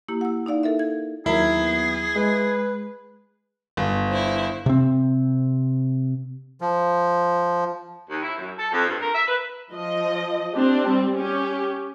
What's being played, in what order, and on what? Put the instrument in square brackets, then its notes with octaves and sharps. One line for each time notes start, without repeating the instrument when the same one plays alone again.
[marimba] A#3 E4 G4
F#5 E6
D#4 E4 D5 F5
A4 A#4 E5
G#6
[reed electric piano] D#2 F#3 [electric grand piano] E4 [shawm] G#4 [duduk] A#4
[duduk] B3
[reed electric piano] G#3 [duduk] B4
[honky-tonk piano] G1
[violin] E4 C5
[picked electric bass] C3 C4
[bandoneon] F3
[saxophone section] D#2
E4
F#2
A4
F2
G2
A#4
E5
B4
[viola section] F3 D#5
C4 D4 G4
G3 C4
C#4 G4